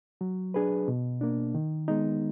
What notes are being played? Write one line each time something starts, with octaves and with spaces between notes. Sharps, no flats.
F#3
D4 G#4 B4
B2
A#3 D4
D#3
G#3 B3 D#4